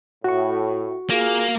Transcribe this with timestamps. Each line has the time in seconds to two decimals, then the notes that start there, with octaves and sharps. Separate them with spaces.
0.24 A2 F#4 C#6
1.09 A#3 F4 G#4